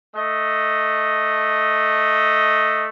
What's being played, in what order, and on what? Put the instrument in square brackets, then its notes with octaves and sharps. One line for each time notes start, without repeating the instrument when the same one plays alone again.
[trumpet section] A3 D#5